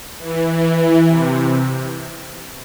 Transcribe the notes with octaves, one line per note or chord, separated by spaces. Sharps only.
E3
E3
E3
C3